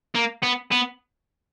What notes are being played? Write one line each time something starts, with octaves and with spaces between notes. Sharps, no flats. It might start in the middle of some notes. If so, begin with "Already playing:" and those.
A#3
B3
B3